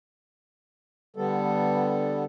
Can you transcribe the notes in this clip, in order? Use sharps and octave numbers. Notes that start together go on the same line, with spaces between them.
D3 G3 B3 A4